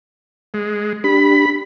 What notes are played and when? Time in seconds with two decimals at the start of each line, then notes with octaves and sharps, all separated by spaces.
0.54 G#3
1.04 D4 G4 B5